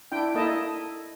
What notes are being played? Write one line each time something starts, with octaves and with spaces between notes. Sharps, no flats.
D4 E4 G5
A#3 D#4 E4 A4 D#5 A5